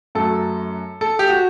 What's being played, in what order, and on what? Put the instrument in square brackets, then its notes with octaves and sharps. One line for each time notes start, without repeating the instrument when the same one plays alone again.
[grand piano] F#2 F#3 A3 A4
A4
G4
F#4